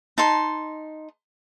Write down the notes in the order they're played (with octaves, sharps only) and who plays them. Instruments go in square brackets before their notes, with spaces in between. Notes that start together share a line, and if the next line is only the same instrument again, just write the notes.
[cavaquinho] D#4 A5 C6